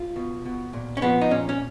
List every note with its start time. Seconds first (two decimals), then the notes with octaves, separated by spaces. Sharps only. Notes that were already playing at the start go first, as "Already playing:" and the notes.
Already playing: F4
0.16 B2
0.46 B2
0.73 A#2
0.97 C#4
1.02 F3 B3
1.21 D#4
1.31 A#2 C#4
1.49 C#4